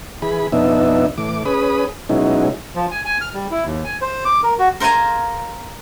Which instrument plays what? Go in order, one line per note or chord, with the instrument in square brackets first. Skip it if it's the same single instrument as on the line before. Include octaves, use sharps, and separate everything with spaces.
[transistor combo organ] E3 G#4 B5
F2 B2 B3 D4 D#4 E5
A2 E3 D6
C#4 G#4 B4 B5 D#6
B2 F#3 G#3 C#4 D#4 E4
[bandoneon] F3
G#5
G#5
F6
G3
E4
D#2
G#5
C5
D6
A#4
F#4
[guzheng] A#4 C5 F5 G#5 A#5